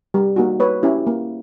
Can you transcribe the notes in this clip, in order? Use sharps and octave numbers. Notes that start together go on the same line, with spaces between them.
G3
A#3 D#4 F#4
A#3 B4 C#5
C#4 E4 G4
A#3